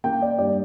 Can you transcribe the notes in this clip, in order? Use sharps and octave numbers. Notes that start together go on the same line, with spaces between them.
A#3 G5
D5
G2 D5